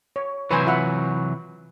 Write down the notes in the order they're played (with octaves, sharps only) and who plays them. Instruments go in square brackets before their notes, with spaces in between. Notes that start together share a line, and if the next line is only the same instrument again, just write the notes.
[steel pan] C#5
[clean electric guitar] C3 E3 F#3 [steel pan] B4 C5 G#5
[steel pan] F4 E5 F#5